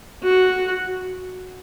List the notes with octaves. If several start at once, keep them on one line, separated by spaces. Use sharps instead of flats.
F#4